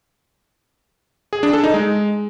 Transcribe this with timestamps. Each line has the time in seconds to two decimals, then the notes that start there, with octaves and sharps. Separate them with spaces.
1.33 G#4
1.43 D4
1.53 A4
1.64 D#4
1.74 G#3